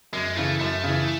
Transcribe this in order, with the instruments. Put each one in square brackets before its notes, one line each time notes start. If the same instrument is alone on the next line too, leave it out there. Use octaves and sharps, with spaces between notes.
[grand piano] F#2 [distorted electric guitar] G#3
[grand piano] C#3 E3 [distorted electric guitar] A3
[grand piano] F#2 [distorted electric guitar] A3
[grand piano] C#3 E3